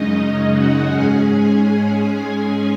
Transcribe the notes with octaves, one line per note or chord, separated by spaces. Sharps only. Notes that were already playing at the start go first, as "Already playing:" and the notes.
Already playing: F#2 C#3 G#3 C#4 D#4 D#5
F#4 F#5
G#2 G#3 C#4 G#4 G#5
G#4 G#5
G#4 G#5
G#4 G#5